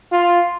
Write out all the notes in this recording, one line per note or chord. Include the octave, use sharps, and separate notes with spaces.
F4